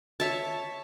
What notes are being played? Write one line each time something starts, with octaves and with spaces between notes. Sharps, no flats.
C#5 E5 A5